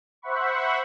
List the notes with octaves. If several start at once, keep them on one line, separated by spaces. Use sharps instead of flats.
C5 E5 F#5 B5 C#6